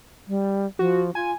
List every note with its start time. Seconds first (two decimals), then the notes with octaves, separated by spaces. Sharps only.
0.28 G3
0.79 F3 F#4
1.15 F4 G#5